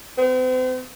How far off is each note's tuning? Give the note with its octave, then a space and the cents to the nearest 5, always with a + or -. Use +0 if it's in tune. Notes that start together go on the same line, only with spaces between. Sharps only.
C4 -40